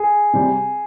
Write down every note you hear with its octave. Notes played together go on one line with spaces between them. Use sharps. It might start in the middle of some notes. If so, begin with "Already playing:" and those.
Already playing: G#4
C3 G3